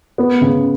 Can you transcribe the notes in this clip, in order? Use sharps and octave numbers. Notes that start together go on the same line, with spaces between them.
B3
C#3